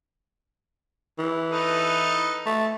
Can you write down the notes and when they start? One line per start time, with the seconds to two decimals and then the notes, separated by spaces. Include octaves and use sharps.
1.19 E3
1.51 D#4 A4 B4
2.46 A3